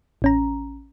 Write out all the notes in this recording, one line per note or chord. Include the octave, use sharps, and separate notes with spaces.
A1 C#4 A#5